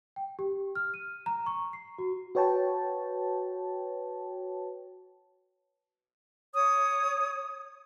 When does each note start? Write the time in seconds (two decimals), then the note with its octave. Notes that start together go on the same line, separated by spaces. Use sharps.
0.16 G5
0.39 G4
0.75 F6
0.94 D#7
1.26 A#5
1.46 C#6
1.73 C7
1.98 F#4
2.35 F#4 B4 C#5 G5 A5
6.53 C#5 D#6